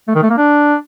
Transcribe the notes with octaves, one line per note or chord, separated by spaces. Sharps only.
A3
D#3
A3
A#3
D4